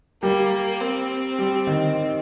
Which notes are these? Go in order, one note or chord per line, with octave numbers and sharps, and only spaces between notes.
G3 A#3
C4
G3
D#3